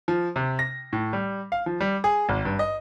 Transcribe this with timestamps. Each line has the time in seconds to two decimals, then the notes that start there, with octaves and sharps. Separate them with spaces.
0.08 F3
0.36 C3
0.59 A#6
0.93 A2
1.13 G3
1.52 F5
1.66 F3
1.81 G3
2.04 G#4
2.29 G#1
2.45 G2
2.59 D#5